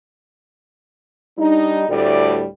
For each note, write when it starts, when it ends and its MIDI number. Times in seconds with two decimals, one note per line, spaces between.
1.37 1.84 55
1.37 1.84 62
1.37 1.84 63
1.89 2.43 38
1.89 2.43 45
1.89 2.43 55
1.89 2.43 69
1.89 2.43 74